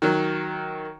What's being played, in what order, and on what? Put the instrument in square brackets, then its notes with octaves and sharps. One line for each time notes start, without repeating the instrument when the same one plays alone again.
[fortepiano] D#3 F#3